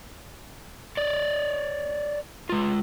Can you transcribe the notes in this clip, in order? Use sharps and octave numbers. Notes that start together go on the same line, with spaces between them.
C#5 D5
G#3 F4